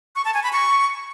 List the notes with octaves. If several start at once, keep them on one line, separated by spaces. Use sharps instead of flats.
C#6
A5
G#5
B5
C#6